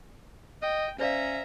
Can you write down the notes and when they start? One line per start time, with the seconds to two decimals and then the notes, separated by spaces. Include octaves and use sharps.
0.62 D#5 G5
0.99 C#4 C5 D5 E5 F5 A#5